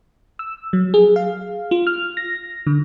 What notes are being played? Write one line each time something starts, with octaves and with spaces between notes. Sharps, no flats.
E6
F#3
G#4
F5
F4
F6
A#6
D3